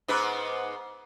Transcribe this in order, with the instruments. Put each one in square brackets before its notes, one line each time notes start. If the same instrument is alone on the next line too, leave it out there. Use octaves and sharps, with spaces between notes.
[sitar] G#2 B3 B4